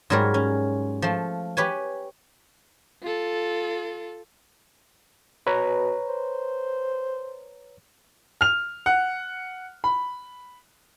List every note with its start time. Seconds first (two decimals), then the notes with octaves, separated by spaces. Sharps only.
0.10 G#2 F#3 G3 A#4 C#5
0.34 C#4
1.02 F3 A3
1.57 G4 B4 C#5 G#5
3.02 F4 A4
5.47 B2 B4 C#5 A#5
6.08 C5
8.41 F6 F7
8.86 F#5
9.84 B5